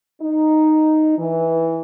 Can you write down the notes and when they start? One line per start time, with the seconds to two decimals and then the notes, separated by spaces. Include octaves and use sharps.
0.20 D#4
1.17 E3